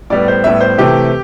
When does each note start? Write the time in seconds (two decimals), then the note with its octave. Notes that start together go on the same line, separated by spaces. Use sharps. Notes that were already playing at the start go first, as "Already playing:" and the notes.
0.10 A2 G3 B3 D5
0.28 C5
0.44 A2 G3 B3 E5
0.61 C5
0.78 C3 E3 A3 C4 G4